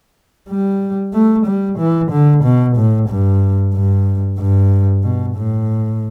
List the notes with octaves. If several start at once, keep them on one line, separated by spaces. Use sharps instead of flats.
G3
A3
G3
E3
D3
B2
A2
G2
G2
G2
B2
A2